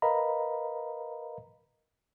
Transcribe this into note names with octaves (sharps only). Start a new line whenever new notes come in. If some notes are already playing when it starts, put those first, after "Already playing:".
A#4 B4 D#5 F5 A#5 B5